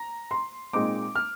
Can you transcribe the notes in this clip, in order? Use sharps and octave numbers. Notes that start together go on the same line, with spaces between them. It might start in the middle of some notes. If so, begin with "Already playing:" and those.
Already playing: A#5
C6
A#2 G#3 C4 D#4 D6
F6